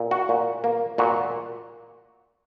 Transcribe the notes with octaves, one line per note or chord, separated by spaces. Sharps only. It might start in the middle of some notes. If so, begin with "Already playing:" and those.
Already playing: A#2
F#4
A#2
A#3
A#2 F#4